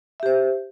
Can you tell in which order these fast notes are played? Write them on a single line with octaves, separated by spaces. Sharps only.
E5 G4 C5